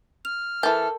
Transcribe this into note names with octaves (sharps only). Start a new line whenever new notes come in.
F6 F7
E3 A4 A#4 A5 G6